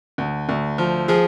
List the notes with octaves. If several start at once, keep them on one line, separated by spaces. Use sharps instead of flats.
D2
D2
F3
F3 G#4